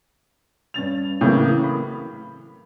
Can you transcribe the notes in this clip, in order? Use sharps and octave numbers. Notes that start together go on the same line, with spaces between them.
G2 C#4 A6 F7
A2 C#3 E3 F#3 A#3
B5